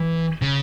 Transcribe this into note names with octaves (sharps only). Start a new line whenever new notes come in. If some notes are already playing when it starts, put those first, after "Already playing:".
Already playing: E3
C#3